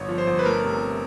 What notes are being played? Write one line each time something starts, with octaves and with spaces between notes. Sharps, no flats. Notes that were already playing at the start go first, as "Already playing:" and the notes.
Already playing: G1 C#5
F3
C5
G1
B4
A3 A#4
C3